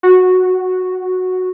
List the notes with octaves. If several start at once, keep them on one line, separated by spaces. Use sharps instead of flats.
F#4